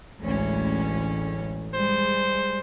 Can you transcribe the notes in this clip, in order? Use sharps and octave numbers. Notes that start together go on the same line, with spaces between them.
A1 D2 G#3 C#4
G3 G#3 C5